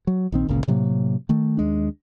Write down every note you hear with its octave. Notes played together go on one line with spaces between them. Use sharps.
F#3
A#1 D#3 C4
G1 C#2 A#2 C#3
A2 C3 F#3 A#3
D#3 A3
D#2 G#3 D4